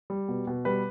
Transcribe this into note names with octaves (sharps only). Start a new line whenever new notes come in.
G3
B2
B2
G3 B4